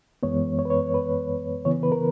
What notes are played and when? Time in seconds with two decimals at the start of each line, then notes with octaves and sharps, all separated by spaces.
0.23 F#2 E3 G#3 B3 C#5
0.59 C#5
0.65 B4
0.70 C#5
0.94 B4
1.65 C#3 E3 B3 C#5
1.83 B4
1.92 A#4